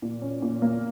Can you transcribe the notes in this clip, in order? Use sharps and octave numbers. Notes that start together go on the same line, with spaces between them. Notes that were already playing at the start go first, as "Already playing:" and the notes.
A#2
C#4
A#2
A#3